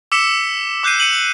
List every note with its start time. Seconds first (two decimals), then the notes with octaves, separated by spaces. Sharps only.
0.12 D6 E6 B6 C#7 E7 G7
0.83 D6 F#6 G6 C7 D#7
1.00 C#7 D#7 F#7